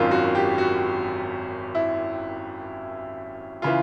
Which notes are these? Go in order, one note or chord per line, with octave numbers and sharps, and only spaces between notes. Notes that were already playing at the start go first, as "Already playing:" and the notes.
Already playing: G#1 F#2 D#3 F4
F#4
G4
F#4
E4
C#3 E3 F4